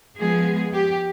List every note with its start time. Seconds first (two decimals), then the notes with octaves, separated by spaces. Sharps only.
0.18 F3 G#3 B3 G#4
0.73 G4